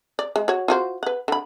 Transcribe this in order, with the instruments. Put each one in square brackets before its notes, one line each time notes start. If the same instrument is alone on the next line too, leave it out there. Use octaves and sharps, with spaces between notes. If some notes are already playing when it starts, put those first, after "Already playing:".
[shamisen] D5
G#3
F#4 C#5
F4 F#4 C5
B4 F#5
D3 B5